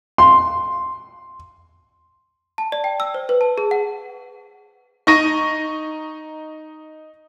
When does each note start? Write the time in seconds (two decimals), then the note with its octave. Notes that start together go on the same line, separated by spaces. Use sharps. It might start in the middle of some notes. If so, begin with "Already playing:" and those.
0.18 C6
2.58 A5
2.72 D5
2.84 G5
3.00 E6
3.14 C5
3.29 B4
3.41 A5
3.58 G#4
3.71 F#5
5.07 D#4 C#6 A#6 D#7